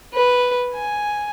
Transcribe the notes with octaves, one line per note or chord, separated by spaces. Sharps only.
B4
G#5